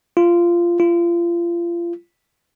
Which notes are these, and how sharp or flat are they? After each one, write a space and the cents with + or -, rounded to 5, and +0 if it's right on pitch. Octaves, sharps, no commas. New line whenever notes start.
F4 -15
F4 -30